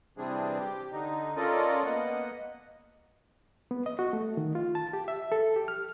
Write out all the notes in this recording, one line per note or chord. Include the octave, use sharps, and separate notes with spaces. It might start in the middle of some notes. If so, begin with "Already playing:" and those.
C3 E3 G3 C4 D4 G#4
G4
D3 D#4
C#4 F4 A4 A#4 D5 D#5
A#3 B3 D#5 F#5
B3
D#5
F#4
A3
D#3
F4
A5
G4
E5
A4
G4
F6